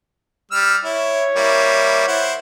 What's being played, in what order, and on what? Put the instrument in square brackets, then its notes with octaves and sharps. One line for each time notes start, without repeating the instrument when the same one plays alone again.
[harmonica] G3 E6 F6
[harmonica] E4 [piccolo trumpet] C#5
[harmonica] G3 A#3 E4
E4 C5 F#5